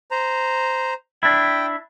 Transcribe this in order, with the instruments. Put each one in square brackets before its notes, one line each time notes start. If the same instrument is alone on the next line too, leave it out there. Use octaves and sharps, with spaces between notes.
[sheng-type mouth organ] C5 A#5
[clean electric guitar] D4 E4 [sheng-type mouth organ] G5